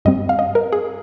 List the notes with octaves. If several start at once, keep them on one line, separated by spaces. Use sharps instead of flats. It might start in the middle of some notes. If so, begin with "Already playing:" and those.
G2 G3 C4 D#5
F5
D#5
A#4
G#4